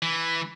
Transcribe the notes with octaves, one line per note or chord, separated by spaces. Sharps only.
E3